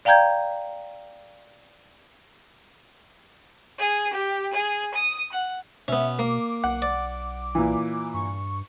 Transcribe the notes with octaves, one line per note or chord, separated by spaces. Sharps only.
D5 F5 G5 A#5 G6 G#6
G#4
G4
G#4
D#6
F#5
B2 B3 C#4 E5
A#3 D6
B1 F#5
D5
A#2 E3
G2 C#6